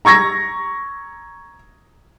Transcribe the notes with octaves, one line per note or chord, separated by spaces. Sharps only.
A#5 C#6 G#6 A#6